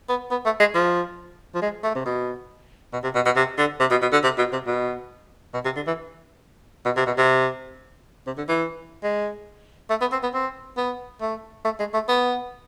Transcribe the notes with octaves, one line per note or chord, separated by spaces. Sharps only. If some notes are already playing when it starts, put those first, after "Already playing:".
B3
B3
A3
G#3
F3
F3
G#3
A3
C3
B2
B2
C3
B2
B2
C3
D3
C3
B2
B2
D3
C3
B2
C3
B2
B2
C3
D3
E3
B2
C3
B2
C3
C3
D3
E3
G#3
A3
B3
C4
B3
C4
B3
A3
A3
G#3
A3
B3